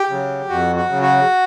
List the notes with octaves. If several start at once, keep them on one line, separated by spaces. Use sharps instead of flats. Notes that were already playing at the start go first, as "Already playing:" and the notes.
Already playing: G4
C#3 F#3
F2 F#4
F#4
C#3 F#3
F#4